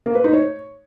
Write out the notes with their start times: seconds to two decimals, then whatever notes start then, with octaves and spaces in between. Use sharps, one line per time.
0.06 A#3
0.15 B4
0.24 D#4
0.33 C#5